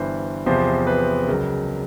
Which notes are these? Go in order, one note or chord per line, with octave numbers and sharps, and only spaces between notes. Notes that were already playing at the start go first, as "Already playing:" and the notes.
Already playing: G1 G2 E3 C5
E2 C3 F3 C5
B4
C#2 C#3 F#3 A#4